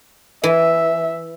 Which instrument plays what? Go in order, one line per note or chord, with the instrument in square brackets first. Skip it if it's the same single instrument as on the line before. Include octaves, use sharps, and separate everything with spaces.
[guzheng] E3 [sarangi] E5